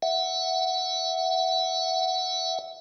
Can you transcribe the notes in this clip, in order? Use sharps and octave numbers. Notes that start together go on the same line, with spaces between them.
E5 F#5